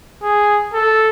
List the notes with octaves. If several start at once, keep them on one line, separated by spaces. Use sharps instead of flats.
G#4
A4